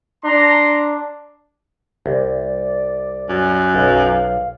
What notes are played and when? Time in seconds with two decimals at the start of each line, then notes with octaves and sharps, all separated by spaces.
0.24 D4 A#5 C6
2.06 C2 D5
3.29 F#2
3.75 B1 F5